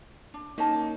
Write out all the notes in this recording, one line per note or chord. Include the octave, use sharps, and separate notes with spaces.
D4
A#3 C#4 D#4 D#5 A5